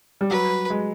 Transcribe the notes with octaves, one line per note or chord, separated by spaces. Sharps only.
G3
F#3 B4
G#3